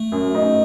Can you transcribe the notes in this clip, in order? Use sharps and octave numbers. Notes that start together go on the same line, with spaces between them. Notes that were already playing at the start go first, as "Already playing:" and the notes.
Already playing: A3
F#2
D#4